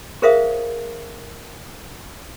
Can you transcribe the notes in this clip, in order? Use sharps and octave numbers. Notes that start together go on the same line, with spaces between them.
G#4 A#4 C5 E5 F5 D#6